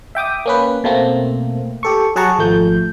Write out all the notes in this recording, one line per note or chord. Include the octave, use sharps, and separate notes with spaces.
E5 G5 D6 D#6
A#3 C#4 B4
B2 A3 A#3 C4
G4 A4 C#6
F#3 G#4 F#5 A5 A#5 C#6
G#1 F3 A3 G6